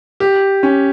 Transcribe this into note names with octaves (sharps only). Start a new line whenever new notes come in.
G4
C#4